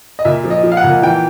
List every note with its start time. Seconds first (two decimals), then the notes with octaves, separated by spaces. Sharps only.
0.19 D#5
0.25 A#2 E5
0.44 F3
0.50 D#5
0.64 F3
0.72 F5
0.77 F#5
0.84 A#2
1.02 E3 G5